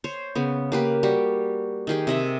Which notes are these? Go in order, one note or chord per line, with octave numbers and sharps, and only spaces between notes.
C5 C#5
C#3 B3
A#3 G4 B4
G3 F#4 G4
D#3 G4 G#4
C3 D#5 E5